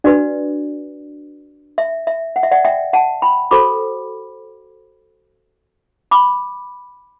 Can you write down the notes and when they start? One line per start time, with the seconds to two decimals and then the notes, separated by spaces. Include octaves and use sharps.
0.04 D4 F#4 B4 D5
1.78 E5
2.07 E5
2.36 F#5
2.43 E5
2.51 D5 F#5
2.65 E5 G5
2.93 F#5 A5
3.22 G5 B5
3.51 F#4 A4 C5 B5 D6
6.11 B5 D6